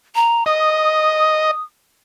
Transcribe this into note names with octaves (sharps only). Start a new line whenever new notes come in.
A#5
D#5 D#6